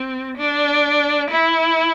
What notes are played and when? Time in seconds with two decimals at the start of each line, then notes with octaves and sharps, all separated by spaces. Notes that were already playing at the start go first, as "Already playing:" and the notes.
Already playing: C4
0.37 D4
1.30 E4